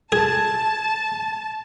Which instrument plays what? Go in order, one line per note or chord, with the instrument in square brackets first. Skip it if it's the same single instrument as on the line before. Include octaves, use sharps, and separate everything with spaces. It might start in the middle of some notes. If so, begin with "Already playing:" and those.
[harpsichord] G#4 [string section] A5 [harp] G#6